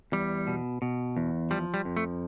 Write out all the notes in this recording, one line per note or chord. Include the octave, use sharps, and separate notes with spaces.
E2 G3
B2
B2
E2
F3 G3
G3
F2
A3